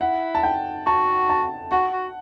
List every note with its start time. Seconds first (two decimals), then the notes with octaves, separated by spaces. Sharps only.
0.01 E4 F#5
0.35 A5
0.43 G5
0.86 F#4 A5
1.30 A5
1.72 F#4 F#5
1.93 F#4